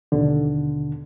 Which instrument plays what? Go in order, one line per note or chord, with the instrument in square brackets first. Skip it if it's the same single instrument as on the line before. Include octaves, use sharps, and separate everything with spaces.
[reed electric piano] D#2 B2 D3